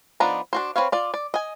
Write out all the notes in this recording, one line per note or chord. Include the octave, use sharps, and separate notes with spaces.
F3 B3 D4 D#4 A#5
D4 F#4 C5
C4 E4 B4 C#5 F5
F4 D5
D5
D#5 G#5